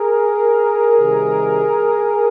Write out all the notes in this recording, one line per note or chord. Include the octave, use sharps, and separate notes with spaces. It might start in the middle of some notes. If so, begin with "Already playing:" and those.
Already playing: G#4 A#4
C3 D#3 G3